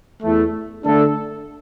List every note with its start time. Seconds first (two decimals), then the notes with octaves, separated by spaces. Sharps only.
0.22 E2 E3 A3
0.83 D3 A3 D4 A4